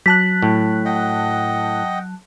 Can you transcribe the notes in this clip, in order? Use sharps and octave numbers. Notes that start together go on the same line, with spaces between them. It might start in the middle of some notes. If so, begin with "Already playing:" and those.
F#3 A5 F#6 B6
A2
D#5 F#5 G5